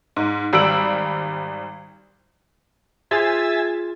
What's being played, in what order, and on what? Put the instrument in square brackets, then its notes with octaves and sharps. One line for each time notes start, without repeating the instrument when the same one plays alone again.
[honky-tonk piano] G#2
G#1 G3 E6 D7 F#7
[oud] F4 G#4 C5 [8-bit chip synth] E5 E6 A6 [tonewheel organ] G#5